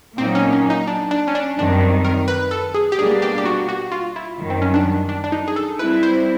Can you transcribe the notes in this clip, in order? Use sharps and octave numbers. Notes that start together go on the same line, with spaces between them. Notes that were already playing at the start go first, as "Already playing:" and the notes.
A#2 F#3 A#3 C4 D#4
C#4
C#4
D#4
D4
D4
C#4
D4
F#2 D#3 G3 C4 D4
A#4
B4
A4
G#4
G4
B2 G3 A#3 D4 G#4
G4
G4
F#4
F#4
F4
E4
F#2 D#3 G3
C4
C#4
D4
D4
D4
D#4
G#4
A4
G3 C4 E4 B4
C5